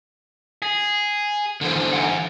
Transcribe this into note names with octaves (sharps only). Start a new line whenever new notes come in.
G#4
D3 E3 C5
F#5 G#5